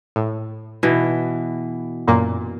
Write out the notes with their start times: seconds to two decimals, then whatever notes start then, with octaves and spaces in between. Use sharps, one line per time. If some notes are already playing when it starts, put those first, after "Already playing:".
0.16 A2
0.83 B2 E3
2.08 F#2 A#2 A#3